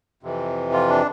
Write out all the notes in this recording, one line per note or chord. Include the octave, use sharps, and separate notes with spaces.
F2 C3 E3
F4
D4